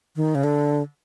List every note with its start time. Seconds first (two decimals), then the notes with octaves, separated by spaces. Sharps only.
0.16 D#3
0.35 C#3
0.44 D3